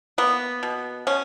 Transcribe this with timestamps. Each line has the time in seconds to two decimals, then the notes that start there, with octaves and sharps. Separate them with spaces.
0.18 A#3 B3
0.63 B2
1.07 B2 C#4